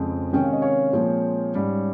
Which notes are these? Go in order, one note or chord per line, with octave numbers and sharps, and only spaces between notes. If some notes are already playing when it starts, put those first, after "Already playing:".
Already playing: F2 C#3 G#3 C4
C3 D#3 G#3 C#4 G5
F5
D#5
C#5 F5
A#2 F3 G#3 C4
G#2 G3 C#4